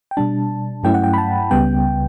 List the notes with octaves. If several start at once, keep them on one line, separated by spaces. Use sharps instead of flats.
G5
B2 G3 D4 A5
G2 F#3 A3 C#4 E4 G5
F#5
G5
B5
A5
C#2 C#3 G3 B3 G5